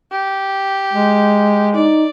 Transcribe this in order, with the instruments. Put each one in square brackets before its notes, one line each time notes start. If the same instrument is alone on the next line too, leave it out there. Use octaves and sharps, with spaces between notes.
[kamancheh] G4
[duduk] G#3
[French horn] D#4 [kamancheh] D5